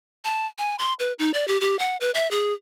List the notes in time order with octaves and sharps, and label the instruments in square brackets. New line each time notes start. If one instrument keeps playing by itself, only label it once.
[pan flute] A5
G#5
C6
B4
D#4
D5
G4
G4
F#5
B4
E5
G#4